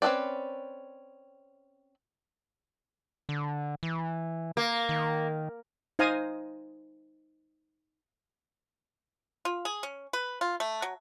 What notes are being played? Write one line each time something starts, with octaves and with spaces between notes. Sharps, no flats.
C4 C#4 A4 B4 D5
D3
E3
A#3
D#3
D#4 C5 F5 G#5 A#5 D#6
F4
G#4
C#4
B4
F4
A3
F#3